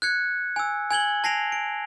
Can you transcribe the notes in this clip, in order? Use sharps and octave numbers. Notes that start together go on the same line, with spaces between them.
F#6 G#6 C#7
G#5 E6
G#5 G#6 F#7 G7
A5 A#6 C7 D7 F7
D7